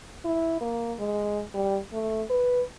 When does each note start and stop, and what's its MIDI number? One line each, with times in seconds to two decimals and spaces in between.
0.25 0.59 64
0.61 0.94 58
0.99 1.42 56
1.55 1.78 55
1.93 2.23 57
2.30 2.62 71